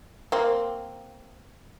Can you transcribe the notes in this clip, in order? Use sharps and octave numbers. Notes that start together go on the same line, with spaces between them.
A#3 C4